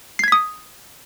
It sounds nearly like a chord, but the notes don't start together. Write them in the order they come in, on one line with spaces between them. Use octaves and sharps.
C7 G#6 B6 D#6